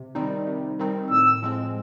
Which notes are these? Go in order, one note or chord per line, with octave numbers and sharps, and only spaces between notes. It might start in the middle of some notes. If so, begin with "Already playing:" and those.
Already playing: C3
D#3 G3 C4 D#4
C3
D#3 G3 C4 D#4
A2 E6
F3 G#3 C4